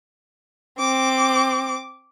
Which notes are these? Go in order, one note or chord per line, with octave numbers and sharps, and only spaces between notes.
C4 D6